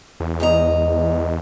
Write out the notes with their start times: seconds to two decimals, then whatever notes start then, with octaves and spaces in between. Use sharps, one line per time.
0.20 E2
0.40 G#2 D#5 A#5